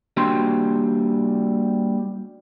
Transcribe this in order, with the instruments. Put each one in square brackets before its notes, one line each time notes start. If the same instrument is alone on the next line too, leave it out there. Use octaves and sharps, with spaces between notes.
[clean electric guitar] G3 A#3 D4 F#4 G5 C6